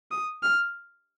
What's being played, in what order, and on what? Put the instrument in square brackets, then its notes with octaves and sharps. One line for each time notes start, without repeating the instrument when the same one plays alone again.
[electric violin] D#6
F6